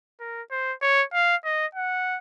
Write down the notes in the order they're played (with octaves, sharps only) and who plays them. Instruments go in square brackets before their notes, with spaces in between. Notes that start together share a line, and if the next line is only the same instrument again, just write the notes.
[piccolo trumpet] A#4
C5
C#5
F5
D#5
F#5